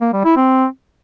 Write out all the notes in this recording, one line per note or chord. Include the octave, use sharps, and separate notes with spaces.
A#3
G3
E4
C4